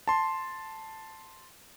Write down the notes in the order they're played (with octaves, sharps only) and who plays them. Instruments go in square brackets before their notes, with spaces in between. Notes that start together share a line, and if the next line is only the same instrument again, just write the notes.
[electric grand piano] A5 C6